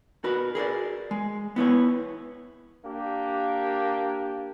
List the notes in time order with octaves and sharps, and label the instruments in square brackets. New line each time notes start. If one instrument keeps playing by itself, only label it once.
[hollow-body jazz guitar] F#4 A#4 B4
G#4 A#4 C#5 D5
G#3
B3 E4 B4 C#5
[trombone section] A#3 D4 G4